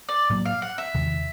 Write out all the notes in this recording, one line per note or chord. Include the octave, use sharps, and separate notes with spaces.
D5
A2 F#3 A#3
F5
F#5
E5
E2 C3 D#3